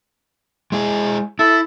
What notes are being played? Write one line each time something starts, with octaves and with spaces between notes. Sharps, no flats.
G#3 E4 G#4
E4 A4